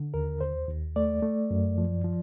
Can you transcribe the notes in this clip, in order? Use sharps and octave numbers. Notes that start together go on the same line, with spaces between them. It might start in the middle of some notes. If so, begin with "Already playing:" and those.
Already playing: D3
D#2 A#4
D#2 C5
D#2
A3 D5
A3
F#2
F3
F3